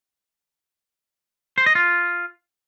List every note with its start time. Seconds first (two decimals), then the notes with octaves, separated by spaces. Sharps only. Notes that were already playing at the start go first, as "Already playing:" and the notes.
1.58 C5
1.66 D#5
1.75 F4